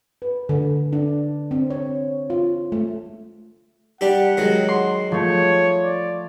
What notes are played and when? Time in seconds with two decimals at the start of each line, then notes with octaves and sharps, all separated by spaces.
0.22 B4
0.49 D3
0.93 D4
1.51 C4
1.70 C#5
2.30 F4
2.72 A3
4.01 G3 D4 G4 F#5
4.37 D#3 F#3 G#3
4.69 C6
5.12 F3 A3 C#5
5.84 D5